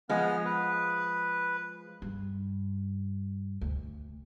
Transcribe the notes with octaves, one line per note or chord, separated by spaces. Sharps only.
F3 G#3 B3 F6
B4
G2
D2